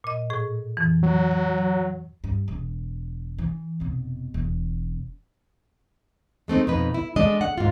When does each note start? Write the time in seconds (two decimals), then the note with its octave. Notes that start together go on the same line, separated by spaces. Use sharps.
0.04 A#2 D#5
0.30 A2 G#4
0.77 F2 E3
1.03 F#3
2.24 G2
2.48 E1
3.38 E3
3.80 F1 B2
4.34 E1
6.48 G#3 A3 C4 D#4
6.67 F2 B2 D#4 B4
6.94 E4
7.16 G#3 A3 D4 D#5
7.41 F#5
7.58 G#2 F4